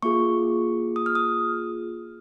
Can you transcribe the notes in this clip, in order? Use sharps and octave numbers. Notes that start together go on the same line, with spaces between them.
A#3 F4 G#4 C#6
D#6
F6
D#6